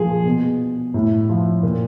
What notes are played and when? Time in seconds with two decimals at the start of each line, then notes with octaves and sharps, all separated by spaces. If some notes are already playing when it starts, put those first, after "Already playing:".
Already playing: A#2 F3 G#4
0.25 B2
0.94 A2
1.29 F3
1.63 A#2